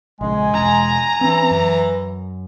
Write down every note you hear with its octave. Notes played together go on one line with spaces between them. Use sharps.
A#1 C#3 G#3 G#5
E1 A#5
E3 C4 C#4
F#2